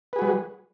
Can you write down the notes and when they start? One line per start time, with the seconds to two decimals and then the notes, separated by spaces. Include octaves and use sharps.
0.13 B4
0.16 G#4
0.19 F#4
0.22 G3